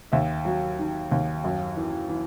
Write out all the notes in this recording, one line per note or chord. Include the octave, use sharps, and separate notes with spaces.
D#2 E5
F#3
D#3
D#2
F#2
E3
E3